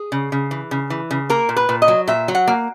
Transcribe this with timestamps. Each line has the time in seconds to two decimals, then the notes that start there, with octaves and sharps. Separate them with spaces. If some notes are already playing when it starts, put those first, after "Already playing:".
Already playing: G#4
0.12 C#3
0.32 C#3
0.51 E3
0.71 C#3
0.90 E3
1.11 C#3
1.30 A#3 A#4
1.49 A#2
1.57 B4
1.69 A#2
1.82 D#5
1.88 F#3
2.08 A#2 E5
2.28 F#3
2.35 F#5
2.47 A#3